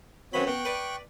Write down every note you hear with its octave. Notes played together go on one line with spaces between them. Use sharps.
F#2 E3 C4 F#4 C#5 B5
B2 G5 C#6 F#6
B4 D5